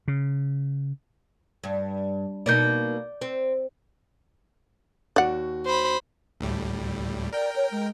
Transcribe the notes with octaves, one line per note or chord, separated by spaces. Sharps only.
C#3
G2
B2 A#3 D#4 D5 G6
C4
D#2 F#4 D5 F#5
C5 B5
D2 A2 G3
A#4 D5 G5
C#5
G#3